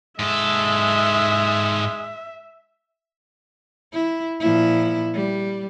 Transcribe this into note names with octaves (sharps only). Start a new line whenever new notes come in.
G#2 G#3 A4 E5
E4
A#2 F3 E4
G3